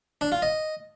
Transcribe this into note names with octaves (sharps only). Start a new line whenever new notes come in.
D4
F4
D#5